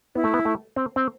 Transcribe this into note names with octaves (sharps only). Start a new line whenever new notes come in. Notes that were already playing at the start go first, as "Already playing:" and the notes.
B3 E4
A3
B3
A3
C4
C4